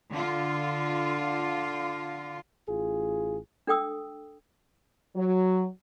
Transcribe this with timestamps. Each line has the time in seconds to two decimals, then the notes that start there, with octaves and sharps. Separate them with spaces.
0.11 D3 F4
2.69 A1 F4 G#4
3.67 D4 A4 G5 D#6 E6
5.16 F#3